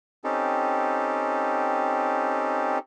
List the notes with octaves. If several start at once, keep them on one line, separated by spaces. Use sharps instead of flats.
C4 C#4 D#4 G4 A4